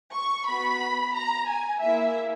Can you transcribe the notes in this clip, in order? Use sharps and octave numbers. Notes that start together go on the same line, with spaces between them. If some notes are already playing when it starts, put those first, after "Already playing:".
C#6
B3 F#4 B5
A#5
G#5
A#3 E4 G#4 E5